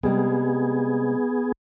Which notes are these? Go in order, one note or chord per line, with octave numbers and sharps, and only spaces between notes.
C3 G3 G#3 B3 G#4